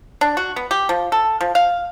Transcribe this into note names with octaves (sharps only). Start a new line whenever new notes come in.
D4
F#4
B3
G4
F3
A4
F3
F5